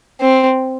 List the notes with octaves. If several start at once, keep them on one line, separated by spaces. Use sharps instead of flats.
C4